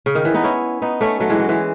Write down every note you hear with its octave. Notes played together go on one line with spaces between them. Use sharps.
C#3
D#3
E3
B3 D#4
C#4 E4
B3 D#4
A3 C#4
F#3 A3
E3 G#3
F#3
E3 G#3